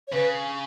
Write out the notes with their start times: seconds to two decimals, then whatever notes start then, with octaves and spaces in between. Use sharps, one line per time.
0.07 C#5
0.12 C#3 B4